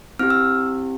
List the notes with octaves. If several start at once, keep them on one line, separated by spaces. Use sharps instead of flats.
C4 E4 G4 F6
E6